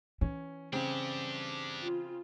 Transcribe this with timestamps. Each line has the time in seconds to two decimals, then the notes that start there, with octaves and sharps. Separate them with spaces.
0.21 E3 C#4
0.73 C#3 C4 D4 G4
1.81 F4